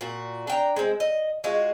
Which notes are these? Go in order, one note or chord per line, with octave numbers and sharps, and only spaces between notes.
A#2 F#4
D4 G5 A#5
G#3 C4
D#5
G#3 F4 F#4